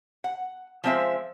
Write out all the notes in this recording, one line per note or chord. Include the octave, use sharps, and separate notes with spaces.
F#5
F3 G#3 C4 A#4 E5 F5